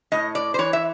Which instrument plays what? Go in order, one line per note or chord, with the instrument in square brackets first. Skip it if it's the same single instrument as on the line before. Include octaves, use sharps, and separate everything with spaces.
[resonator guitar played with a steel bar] A2 D#5
D5
C5
E3 C#5
E5